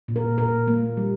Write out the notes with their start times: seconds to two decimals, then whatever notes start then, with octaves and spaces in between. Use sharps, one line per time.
0.08 A#2
0.16 A#4
0.38 A#2 A#4
0.68 A#3
0.97 G3